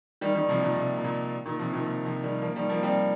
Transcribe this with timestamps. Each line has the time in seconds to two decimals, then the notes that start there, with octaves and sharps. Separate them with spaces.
0.21 D#3 G3
0.35 D#3 G3
0.49 C3 F3
0.63 A#2 D#3
0.77 C3
0.98 C3
1.04 A#2
1.46 A#2 D#3
1.59 C3 F3
1.73 A#2 D#3
1.87 C3
2.05 C3 F3
2.23 D#3 G3
2.42 F3 A#3
2.56 D#3 G3
2.69 F3 A#3
2.83 G3 C4